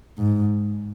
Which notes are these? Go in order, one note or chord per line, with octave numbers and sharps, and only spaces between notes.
G#2